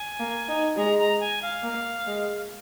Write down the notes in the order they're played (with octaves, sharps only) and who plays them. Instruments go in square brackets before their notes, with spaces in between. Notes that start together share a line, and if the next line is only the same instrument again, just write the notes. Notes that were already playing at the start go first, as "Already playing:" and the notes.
Already playing: [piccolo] G#5
[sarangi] A#3
D#4
[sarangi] G#3 [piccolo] A#5
[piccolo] A#5
G#5
F5
[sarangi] A#3
G#3